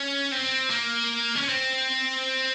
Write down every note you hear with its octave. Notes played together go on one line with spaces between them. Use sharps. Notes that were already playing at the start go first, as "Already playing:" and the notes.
Already playing: C#4
C4
A#3
C#4
C4